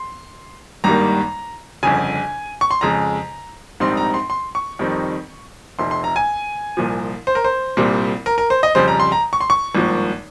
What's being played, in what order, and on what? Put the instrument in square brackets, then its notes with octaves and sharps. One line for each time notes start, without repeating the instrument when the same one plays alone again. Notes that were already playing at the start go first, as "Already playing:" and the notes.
Already playing: [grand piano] C6
G#1 G2 D#3 G3 A#3 A#5
G1 F2 C#3 G#5
C#6
C6
F2 C#3 G#3 A#5
A#1 G#2 G3 C4 D#4 C6
A#5
C6
C6
C#6
F2 D#3 G3 C4 D#4
F1 F2 C3 C6
C6
A#5
G#5
C2 A#2 F3
C5
A#4
C5
C2 A#2 G3 C4
A#4
A#4
C5
D#5
F2 C#3 G3 C5
A#5
C6
A#5
C#6
C6
C#6
G#1 G2 F3 A#3